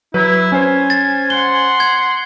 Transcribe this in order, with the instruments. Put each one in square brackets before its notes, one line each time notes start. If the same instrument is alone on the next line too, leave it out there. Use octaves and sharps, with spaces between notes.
[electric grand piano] F#3 B4 [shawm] E4
[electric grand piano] C#4 C5 [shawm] G#5
[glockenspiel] A6
[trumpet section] F#5 C6 [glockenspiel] G7
[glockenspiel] G#6